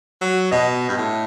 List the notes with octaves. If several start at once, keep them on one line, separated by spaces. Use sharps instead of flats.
F#3
B2 D#5
G2
A2